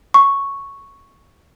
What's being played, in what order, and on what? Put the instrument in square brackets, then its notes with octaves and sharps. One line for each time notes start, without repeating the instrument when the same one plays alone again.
[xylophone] C#6